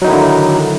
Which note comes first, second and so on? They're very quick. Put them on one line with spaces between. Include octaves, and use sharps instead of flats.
F#3 D#4 D#3 E4 D3